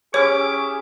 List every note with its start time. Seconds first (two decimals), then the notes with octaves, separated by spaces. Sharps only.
0.14 C#4 E4 G4 G#4 C#5 D6